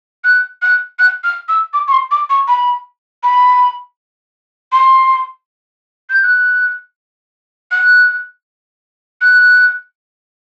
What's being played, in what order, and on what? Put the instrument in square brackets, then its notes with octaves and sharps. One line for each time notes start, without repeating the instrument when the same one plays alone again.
[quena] F#6
F#6
F#6
F6
E6
D6
C#6
C6
D6
C#6
B5
B5
C6
G6
F#6
F#6
F#6